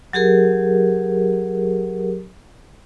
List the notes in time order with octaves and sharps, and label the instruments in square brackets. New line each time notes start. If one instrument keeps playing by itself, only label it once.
[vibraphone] F#3 G4 G#4 A#4